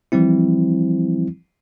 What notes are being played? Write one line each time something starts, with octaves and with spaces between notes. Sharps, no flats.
E3 F3 G3 C4 E4